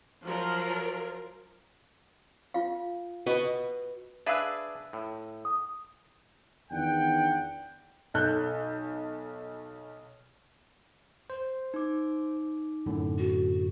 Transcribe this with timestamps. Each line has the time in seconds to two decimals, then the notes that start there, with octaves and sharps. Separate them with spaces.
0.24 F3 F#3 F4 A#4
2.54 F4 F5
3.26 F#4 B4 D#5
4.26 D4 G#4 B4 E5 F5 E6
4.93 A2
5.45 D#6
6.71 E2 D#3 D4 F#5 G5
8.14 B1 A4 F#6 G6
11.30 C5
11.74 D#4 D6
12.86 F#2 A2 D3
13.18 F#4